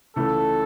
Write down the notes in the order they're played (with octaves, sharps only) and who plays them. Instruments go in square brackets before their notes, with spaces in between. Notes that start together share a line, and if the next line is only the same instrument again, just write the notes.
[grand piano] C#2 C#3 E3 A3 [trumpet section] A4